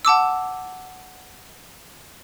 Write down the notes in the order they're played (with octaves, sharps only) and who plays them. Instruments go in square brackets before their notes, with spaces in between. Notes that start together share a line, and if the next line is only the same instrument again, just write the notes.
[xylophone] F#5 A5 D6 E6